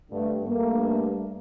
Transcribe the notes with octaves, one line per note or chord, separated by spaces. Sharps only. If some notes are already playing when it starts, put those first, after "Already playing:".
G2 D3 A3
G2 A3 A#3